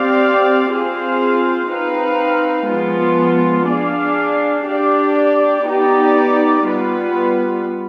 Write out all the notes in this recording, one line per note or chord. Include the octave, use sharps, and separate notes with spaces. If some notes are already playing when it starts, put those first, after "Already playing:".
Already playing: C4 G4 D5 F5
C4 F4 G#4 C5 F5
C4 D#4 B4 F5
F3 G#3 B3 F4
D4 G#4 D5 F5
D4 G4 D5
B3 D#4 G4 D5
G3 B3 F4 B4